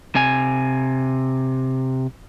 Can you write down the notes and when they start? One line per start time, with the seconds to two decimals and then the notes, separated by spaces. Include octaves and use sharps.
0.15 C3 G#5